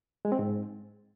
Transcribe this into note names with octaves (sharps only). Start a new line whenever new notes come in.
G#3
C4
G#2